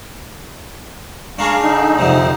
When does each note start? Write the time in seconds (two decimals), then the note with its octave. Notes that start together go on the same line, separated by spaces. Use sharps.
1.39 D4 G#4 F5 A#5 C#6
1.62 D3 D#4
1.99 F2 C3